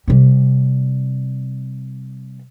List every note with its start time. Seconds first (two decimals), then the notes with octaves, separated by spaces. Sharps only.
0.08 C3 G3